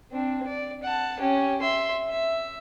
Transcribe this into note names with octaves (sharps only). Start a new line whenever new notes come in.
C4 D4
D5
F#5 A5
C#4 G4
E5 C6
E5